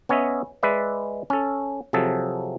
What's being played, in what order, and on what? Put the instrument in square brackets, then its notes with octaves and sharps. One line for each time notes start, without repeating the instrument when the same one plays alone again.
[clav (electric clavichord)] B3 C#4 C#5 D#5 E5
G#3 B4 D5 E5
C#4 A4
C3 F3 F#3 G#4 A4